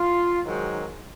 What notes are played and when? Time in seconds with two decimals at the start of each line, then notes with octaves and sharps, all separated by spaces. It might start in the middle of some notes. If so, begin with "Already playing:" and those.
Already playing: F4
0.44 G#2 D#3 F#3